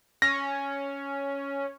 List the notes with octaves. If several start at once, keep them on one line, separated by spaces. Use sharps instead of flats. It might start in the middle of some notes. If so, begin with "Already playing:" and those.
C#4 A#6